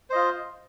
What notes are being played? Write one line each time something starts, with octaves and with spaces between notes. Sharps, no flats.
F4 C5 D#5